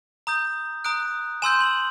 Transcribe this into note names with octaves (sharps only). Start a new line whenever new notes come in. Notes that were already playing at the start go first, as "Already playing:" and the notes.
A#5 D#6 G6
A#5 D#6 F#6 D7
G#5 C6 E6 G6 E7
F#7